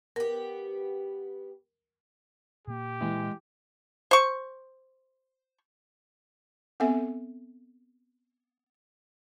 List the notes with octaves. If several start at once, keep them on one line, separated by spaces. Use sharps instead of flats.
B3 G4 A#4
A#2 A#3 G4
E3 G#3 D#5
C5 C#6
B3 C4 A4 E5 G#5